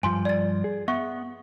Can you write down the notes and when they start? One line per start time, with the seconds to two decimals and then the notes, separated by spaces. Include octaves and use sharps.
0.03 G2 F3 G#5 C6
0.25 D5 A6
0.64 G#4
0.88 B3 E5 F#5 C#6